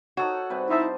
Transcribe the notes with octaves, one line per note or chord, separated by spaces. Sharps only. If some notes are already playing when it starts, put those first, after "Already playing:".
D#4 F#4 A4 C#5
C3 G3 B4
D#4 E4 C5 D#5 E5 A5